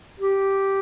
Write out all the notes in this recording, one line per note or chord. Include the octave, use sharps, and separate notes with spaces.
G4